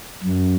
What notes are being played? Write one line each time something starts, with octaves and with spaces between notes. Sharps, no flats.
F#2